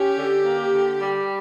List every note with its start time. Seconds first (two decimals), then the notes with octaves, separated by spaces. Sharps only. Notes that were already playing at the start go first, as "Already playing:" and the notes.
Already playing: C#4 G4
0.17 D3
0.45 A#3
0.73 D3
1.01 G3